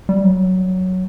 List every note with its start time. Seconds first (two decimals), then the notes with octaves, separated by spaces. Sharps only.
0.09 G3
0.24 F#3